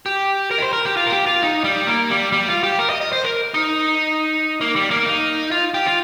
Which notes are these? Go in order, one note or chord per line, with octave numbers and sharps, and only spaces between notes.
G4
A#4
D#5
C5
A#4
G4
F4
A#4
G4
F4
D#4
G3
A#3
G3
G3
F4
G4
A#4
D#5
D#5
C5
A#4
D#4
A#3
G3
A#3
D#4
F4
G4
F4